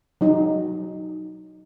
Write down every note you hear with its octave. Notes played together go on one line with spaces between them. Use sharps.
F#3 D#4